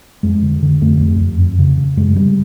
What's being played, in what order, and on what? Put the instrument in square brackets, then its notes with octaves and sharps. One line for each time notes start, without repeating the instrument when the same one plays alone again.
[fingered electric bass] F2 G#3
D3
D3
F2 A3
F2
F2
F#2
C#3
C#3
F#2 G#3
C#3 G3